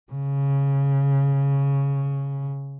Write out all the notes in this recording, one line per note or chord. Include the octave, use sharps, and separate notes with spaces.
C#3